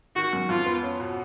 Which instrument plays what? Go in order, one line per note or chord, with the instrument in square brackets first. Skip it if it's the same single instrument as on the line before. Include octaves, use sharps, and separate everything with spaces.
[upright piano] D#3 [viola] F#4
[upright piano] F#2
[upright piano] F2 [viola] F4
[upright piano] B3
C#4
B2